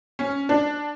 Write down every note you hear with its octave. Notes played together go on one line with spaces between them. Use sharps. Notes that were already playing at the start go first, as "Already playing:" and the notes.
C#4
D4